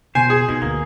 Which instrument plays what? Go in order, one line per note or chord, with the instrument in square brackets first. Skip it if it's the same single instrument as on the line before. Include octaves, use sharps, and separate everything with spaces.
[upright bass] B2 [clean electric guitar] C5 [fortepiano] G#5
[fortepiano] G#4
[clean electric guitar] B2 [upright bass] D#4
[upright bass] D2 [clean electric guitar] A#3